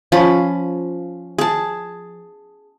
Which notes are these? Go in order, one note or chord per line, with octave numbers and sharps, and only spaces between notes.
F3 C#4 B5
G#4 A5